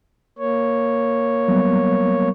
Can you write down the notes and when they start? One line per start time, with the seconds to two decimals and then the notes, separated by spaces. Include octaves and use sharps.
0.38 A#3 C#5
1.48 F#3 G3 B3